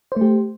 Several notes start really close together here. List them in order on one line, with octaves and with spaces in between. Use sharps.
C5 A3 G4